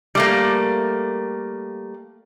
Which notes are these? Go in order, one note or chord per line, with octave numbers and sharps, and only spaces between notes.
G3 A3 A#3